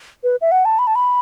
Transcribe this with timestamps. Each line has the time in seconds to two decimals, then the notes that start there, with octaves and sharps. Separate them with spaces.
0.24 B4
0.41 E5
0.52 F#5
0.65 A5
0.79 B5
0.87 A5
0.95 B5